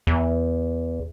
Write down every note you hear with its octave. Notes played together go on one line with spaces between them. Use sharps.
E2